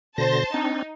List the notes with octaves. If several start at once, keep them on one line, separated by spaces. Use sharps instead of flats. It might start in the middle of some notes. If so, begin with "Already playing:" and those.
B2 D3 C5 A5 A#6
C4 D4 D#4